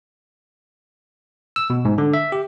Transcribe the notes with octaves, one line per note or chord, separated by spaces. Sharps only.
E6
B2
G#2
D3
E5
G4